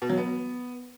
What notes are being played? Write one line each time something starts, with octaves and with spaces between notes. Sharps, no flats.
B2
F#3
B3